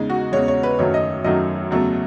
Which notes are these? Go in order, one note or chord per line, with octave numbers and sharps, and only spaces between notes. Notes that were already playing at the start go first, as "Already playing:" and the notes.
Already playing: E2 C#3 G#3 D#4
F#4
E2 C#3 G#3 C#5
C#5
B4
F#2 D#3 F#3 A3 C#5
D#5
F#2 D#3 F#3 A3 D#5
E2 C#3 F#3 A3